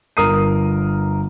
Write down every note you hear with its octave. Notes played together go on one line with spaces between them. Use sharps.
G1 A#4 D#6 C7 D#7